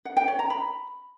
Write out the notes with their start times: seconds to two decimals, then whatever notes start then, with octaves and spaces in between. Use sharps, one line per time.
0.05 F#5
0.17 G5
0.28 C#5
0.39 A#5
0.50 B5